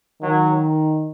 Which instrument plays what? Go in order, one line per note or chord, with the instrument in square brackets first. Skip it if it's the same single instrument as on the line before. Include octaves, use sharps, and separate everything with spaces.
[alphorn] D#3 [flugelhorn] F#3